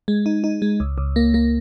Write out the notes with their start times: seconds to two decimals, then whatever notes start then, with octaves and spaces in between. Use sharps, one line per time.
0.08 G#3
0.26 D#4
0.44 D#4
0.62 G#3
0.80 C#2
0.98 C#2
1.16 A#3
1.34 A#3